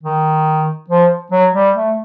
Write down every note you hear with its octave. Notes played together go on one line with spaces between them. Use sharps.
D#3
F3
F#3
G3
A3